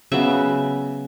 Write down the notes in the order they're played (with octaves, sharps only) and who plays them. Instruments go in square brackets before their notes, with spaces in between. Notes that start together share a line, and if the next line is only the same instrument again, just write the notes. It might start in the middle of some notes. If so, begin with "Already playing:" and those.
[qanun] C#3 F#3 B3 E5